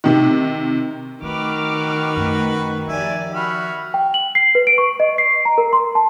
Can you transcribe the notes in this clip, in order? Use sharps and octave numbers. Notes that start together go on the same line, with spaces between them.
C3 D#3
D#3 A3 F#4 B4 D6 F6
F#2 A3
F3 G4 D5 E5 G#5
F#4 E5 B5 F6
G5
F#7
C7
B4
D7
C#6
D#5
C7
A#5
A#4
C6
A5